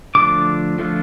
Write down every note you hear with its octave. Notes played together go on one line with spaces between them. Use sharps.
D3 F3 A3 D4 F4 D6
D3 F3 A3 D4 F4